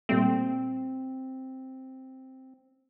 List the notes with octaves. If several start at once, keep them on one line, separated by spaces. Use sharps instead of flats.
A#2 G3 A3 C4